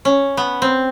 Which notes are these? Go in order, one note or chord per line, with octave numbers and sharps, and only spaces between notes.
C#4
B3
C4